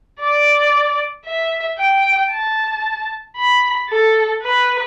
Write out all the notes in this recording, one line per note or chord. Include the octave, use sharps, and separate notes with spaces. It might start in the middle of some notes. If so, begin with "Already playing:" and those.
D5
E5
G5
A5
B5
A4
B4